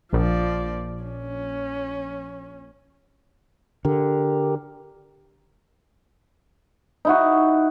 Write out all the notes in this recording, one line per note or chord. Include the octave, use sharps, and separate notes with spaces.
A#1 F3 D5
C#4
D3 G4 A#4
D#4 E4 F#4